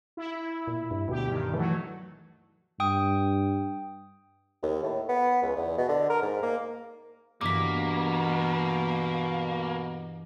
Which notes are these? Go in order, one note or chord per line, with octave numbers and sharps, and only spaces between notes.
E4
A#2
G2
D2 B2 G4
G2 D#3
E3 F#3 A3
G2 G5 D#6
D#2
A2
B3
C#2
E2
B2
D3
A#4
G#2
A#3
G2 B2 E3 A#3 D6 B6